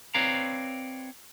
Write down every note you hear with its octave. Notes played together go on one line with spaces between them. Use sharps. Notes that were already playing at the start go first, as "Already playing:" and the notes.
C4 B4 C#5 D5 F5 A#5